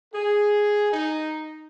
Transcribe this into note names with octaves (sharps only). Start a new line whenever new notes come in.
G#4
D#4